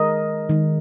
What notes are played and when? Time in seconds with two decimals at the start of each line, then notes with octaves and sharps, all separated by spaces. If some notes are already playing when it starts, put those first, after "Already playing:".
Already playing: D#3 G#3 A#4 D#5
0.49 D#3 G#3